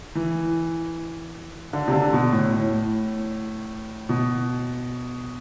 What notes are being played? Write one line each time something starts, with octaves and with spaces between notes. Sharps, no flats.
E3
D3
C3
D3
B2
A2
A2
B2